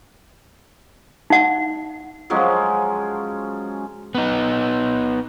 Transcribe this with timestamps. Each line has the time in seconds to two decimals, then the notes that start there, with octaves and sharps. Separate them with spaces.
1.30 D#4 F#5
2.30 F3 F#3 G#3 C#4
4.15 B3 D#4